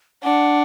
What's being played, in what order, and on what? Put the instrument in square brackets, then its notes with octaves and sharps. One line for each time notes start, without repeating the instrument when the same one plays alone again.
[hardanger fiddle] D4 [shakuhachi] F#5